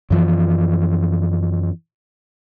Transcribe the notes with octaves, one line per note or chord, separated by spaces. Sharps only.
F#2 E3 F3